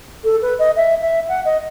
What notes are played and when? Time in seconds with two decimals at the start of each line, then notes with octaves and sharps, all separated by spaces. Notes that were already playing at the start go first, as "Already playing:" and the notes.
0.24 A4
0.42 B4
0.59 D#5
0.76 E5
1.01 E5
1.28 F#5
1.45 D#5